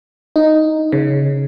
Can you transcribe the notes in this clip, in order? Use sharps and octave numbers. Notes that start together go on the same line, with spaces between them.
D#4
C#3